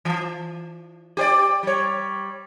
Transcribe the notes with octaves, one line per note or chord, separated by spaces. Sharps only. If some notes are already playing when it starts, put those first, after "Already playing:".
E3
G4 C5 D5
G3 C#5